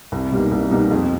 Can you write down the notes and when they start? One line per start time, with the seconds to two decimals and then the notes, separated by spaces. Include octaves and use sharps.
0.12 C2
0.31 B2 G3 A#3 D#4
0.51 C2
0.70 B2 G3 A#3 D#4
0.91 F2